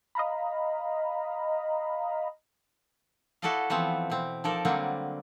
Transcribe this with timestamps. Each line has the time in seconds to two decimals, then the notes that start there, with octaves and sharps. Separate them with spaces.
0.15 D#5 F5 A#5 B5
3.42 E4 F#4 A4 D5 D#5 F5
3.70 E3 F3 B3 C4
4.10 B2 C4
4.44 F3 D#4 A4 A#4 D5
4.65 D3 F#3 G3 A#3 C4 D4